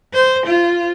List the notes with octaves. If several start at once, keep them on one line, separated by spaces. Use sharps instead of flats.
C5
F4